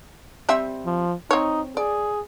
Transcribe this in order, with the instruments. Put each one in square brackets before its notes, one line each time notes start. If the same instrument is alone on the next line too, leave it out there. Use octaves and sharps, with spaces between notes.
[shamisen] G3 C4 E5
[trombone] F3
[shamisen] C4 C#5 [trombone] D#4
[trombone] G#4 [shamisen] D5